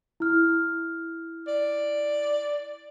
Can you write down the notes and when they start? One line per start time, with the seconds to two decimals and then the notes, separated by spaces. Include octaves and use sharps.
0.20 E4 F6
1.47 D5